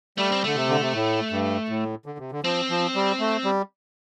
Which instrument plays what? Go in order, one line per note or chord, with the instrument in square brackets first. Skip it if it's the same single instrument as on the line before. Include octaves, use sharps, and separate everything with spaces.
[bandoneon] G3 [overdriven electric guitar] A3
[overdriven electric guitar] C4
[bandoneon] D3 [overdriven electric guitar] A3
[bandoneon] C3
D3
C3
A2
G2
A2
D3
C3
D3
[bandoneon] F3 [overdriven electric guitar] C4
[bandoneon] F3
G3
A3
G3